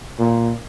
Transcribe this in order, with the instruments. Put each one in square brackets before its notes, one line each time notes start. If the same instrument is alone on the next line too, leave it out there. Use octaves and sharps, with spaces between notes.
[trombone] A#2